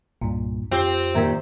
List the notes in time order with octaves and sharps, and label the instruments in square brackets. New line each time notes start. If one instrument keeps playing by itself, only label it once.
[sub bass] C2 [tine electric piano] G2 A#2
[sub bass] F2 [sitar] C4 [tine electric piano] F4 G4
[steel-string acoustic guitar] A#2 D#3 G4 [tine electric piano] E5 A#5 G#6